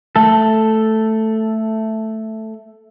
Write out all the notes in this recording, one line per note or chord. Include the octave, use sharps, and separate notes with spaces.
A3 A4